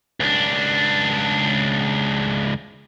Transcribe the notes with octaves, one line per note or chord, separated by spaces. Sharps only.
C#2 D4